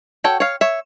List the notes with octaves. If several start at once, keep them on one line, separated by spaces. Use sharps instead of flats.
F#4 A4 C#5 G5
C#5 F5
C#5 E5